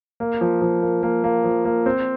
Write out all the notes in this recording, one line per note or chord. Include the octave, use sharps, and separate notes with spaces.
A#3
F3
F3
A#3
A#3
A#3
F3
A#3
C4